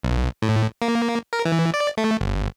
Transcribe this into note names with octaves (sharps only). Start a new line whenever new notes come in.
B1
A2
A#3
A#4
E3
D5
A3
G1